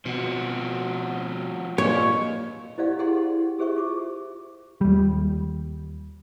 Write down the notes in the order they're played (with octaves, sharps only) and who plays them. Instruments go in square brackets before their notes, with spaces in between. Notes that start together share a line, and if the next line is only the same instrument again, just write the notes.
[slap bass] B2 [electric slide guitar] F3 C4 F#4
[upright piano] A#2 [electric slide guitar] G4 D#5 [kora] C#5
[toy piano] E4 G4 C5 D5 F5 F#5
E4 G4 G#4 F#5 G5 C6
G4 G#4 C5 E5 C#6
F4 D6
[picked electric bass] D#2 G3